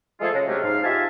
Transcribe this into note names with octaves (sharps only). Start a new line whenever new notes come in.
F3 G#3 A3 F4 G#4 A4
C#3 G#3
C3 F#3 G#3 A3 C#4 D4
G#2 F5
D#4 F4 G4 E5 G#5 A5